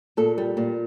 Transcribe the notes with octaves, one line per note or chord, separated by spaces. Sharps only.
A#2 A4
G3
A#2